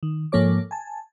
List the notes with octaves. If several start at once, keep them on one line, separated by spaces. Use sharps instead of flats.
D#3
G#2 F3 A#3 A4 C#5 D6
G#5 A5